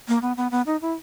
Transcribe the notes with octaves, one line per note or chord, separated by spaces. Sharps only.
A#3
B3
B3
B3
D#4
E4